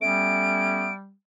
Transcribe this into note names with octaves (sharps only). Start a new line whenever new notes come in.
G3 A3 B3 C#4 D7